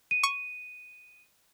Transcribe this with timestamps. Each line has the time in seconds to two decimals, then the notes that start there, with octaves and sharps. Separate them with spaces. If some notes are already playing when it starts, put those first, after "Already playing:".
0.11 D#7
0.23 C#6